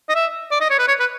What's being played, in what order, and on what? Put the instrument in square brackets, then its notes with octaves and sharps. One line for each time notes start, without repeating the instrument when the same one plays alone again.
[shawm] D#5
E5
D5
D#5
C#5
B4
C#5
B4